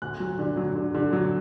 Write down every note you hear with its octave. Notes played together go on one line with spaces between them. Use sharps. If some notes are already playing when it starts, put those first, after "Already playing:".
D2 F#6
F#3
D3
F#3
D3
D3
F#3